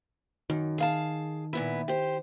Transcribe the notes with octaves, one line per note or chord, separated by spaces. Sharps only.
F#2 D#3
G#4 F5 A5
A#2 B3 E4
G4 C5